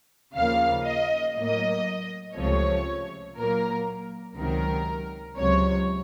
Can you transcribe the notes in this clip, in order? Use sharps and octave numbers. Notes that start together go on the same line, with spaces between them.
D#2 C#3 F3 A#3 F5
D#5
A2 F#3 A#3 D#5
C#2 C3 F3 A3 C#5
A#2 F#3 A#3 A#4
C#2 C3 D#3 F#3 A#4
C#2 C3 F#3 C#5